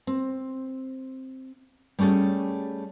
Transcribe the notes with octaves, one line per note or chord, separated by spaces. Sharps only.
C4
G3 A3 C#4 G#4 A4